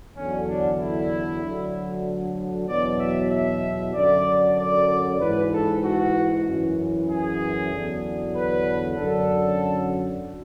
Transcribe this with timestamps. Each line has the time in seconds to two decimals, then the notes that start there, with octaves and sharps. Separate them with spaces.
0.15 E2 D3 F#3 C#4
0.47 D4
0.79 E4
1.42 D2 D3 F#3
2.68 E2 B2 F#3 D5
2.99 E5
3.31 E5
3.94 F#2 D3 F#3 D5
4.57 D5
5.20 G#2 E3 B4
5.52 A4
5.83 F#4
6.46 F#2 E3
7.09 G#4
7.72 E2 D3 F#3
8.36 B4
8.98 F#2 D3 F#3 A4